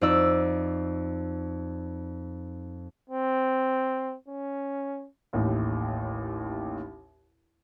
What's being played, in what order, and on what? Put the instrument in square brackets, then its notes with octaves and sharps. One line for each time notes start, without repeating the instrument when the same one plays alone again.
[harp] F2 D#4 D5 E6
[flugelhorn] C4
C#4
[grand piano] A1 D#2 A2